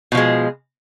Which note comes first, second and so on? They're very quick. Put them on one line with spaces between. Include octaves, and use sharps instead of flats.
B2 F3 G#3